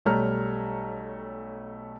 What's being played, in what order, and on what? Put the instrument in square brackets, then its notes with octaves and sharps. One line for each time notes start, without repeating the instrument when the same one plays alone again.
[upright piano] B1 G3 A3 C#5 A#5 F6